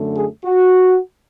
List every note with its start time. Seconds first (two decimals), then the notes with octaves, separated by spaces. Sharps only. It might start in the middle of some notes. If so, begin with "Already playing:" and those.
Already playing: F#2 D3 A3
0.15 G#4
0.44 F#4